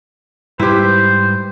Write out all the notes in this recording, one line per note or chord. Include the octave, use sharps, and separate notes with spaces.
G#2 G3 E4 G4 B4 C5